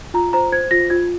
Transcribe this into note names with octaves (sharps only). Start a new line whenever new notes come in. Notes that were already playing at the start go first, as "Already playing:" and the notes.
F4 A#5
C5 A#5
C5 G#6
F4 A#6
F4 G#6